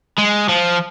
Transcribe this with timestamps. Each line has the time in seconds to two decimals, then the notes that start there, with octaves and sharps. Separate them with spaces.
0.18 G#3
0.49 F3